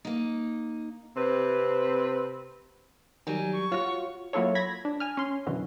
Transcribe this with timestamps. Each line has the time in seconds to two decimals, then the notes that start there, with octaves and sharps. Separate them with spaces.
0.05 A#3 D#4
1.17 C3 C4 B4
3.27 D#3 F#3 G3 G#5
3.53 C#6
3.72 F4 F#4 C#5
4.33 F#3 A#3 E4 F4 A4 C#5
4.55 B5 G#6 A#6 B6
4.85 D4
5.00 G#5 F6
5.17 C#4 C6
5.46 F#2 B2 D3 E3